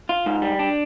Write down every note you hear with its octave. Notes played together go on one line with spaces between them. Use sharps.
F4
G#2
G3
D4